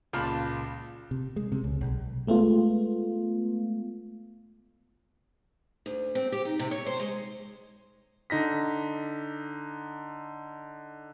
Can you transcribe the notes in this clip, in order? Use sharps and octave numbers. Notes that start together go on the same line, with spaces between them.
C#2 A#2 F4 A5 B5
C3
G#3
C3
C#2
B1
G#3 A3 B3 F4
D2
C4
G4
D#4
C3
C#5
C5
G#3
D3 D#4 A#6 B6